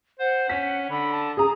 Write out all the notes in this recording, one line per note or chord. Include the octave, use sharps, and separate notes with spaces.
C5 F#5
C#4 B6
D3 B5
A5
G#4 A#5 D#6